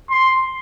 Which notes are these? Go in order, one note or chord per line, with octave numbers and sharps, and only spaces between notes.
C6